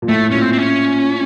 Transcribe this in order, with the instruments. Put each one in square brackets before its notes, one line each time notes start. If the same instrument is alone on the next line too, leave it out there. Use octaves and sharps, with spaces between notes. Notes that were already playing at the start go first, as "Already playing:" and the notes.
[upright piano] A#2
[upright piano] A2 [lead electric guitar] A3
[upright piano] A#2 [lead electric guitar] C#4
[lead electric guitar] C4
C4
C#4